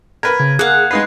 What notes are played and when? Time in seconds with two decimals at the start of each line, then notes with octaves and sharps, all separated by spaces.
0.23 A#4 B4 B5 G#6
0.40 C#3 G#6
0.59 A#3 G#4 F5 F#5 F#6
0.91 G#3 D#4 B4 C7